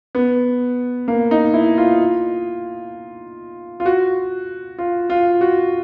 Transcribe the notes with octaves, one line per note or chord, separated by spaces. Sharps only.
B3
A#3
D#4
E4
F4
F4
F#4
F4
F4
F#4